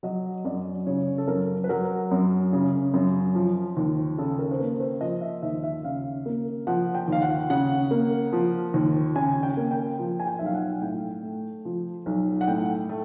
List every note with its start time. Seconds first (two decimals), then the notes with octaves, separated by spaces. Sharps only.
0.03 F#3 D#5
0.45 F#2 D5
0.86 C#3 C#5
1.18 A4
1.27 F#2 A#4
1.64 B4
1.69 F#3 A#4
2.11 F#2
2.53 C#3
2.94 F#2
3.35 F3
3.77 D#2
4.18 C#3 A4
4.39 A#4
4.51 C5
4.60 A#3 B4
4.80 C5
5.01 F3 D#5
5.21 E5
5.43 D#2 E5
5.64 E5
5.84 C#3 F5
6.26 A#3
6.67 F3 F#5
6.95 G5
7.08 D#2 F5
7.22 F#5
7.50 C#3 F#5
7.91 A#3
8.33 F3
8.74 D#2
9.15 C#3 G#5
9.43 G5
9.57 A#3
9.71 G5
9.99 F3
10.20 G#5
10.26 G5
10.39 B1 E5
10.46 F5
10.54 F#5
10.81 A2 G5
11.23 A3
11.65 F3
12.06 B1
12.41 F#5
12.47 A2 G5
12.89 A3